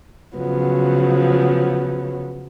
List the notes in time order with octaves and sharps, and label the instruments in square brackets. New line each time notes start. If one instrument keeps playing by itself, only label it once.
[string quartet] C#3 F3 F#3 B3